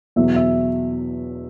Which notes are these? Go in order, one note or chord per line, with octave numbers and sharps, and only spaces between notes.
E2 B2 F#3 E5
E5